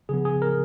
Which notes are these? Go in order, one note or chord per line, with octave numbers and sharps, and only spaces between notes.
C#3 F3 B3 G#4
G#4
A#4